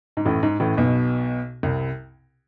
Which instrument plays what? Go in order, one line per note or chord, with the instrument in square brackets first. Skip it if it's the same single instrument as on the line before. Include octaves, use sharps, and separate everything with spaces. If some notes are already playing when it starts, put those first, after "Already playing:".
[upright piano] G#2
A1 A2
G#2
A1 A2
B1 B2
C2 C3